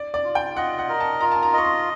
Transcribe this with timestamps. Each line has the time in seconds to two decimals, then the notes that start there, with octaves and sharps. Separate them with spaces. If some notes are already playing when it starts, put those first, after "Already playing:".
Already playing: D5
0.14 D5
0.24 F4
0.35 G5
0.56 D#5 F#5
0.79 F#5
0.89 A#4
1.00 A5
1.21 F4 A#5
1.32 A5
1.43 A#5
1.53 D#5 C#6
1.64 C6